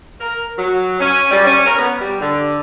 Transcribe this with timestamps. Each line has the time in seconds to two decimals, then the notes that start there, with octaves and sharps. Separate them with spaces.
0.20 A#4
0.58 F#3
1.00 C#4
1.31 G3
1.45 C#4
1.65 A#4
1.79 B3
2.00 G3
2.21 D3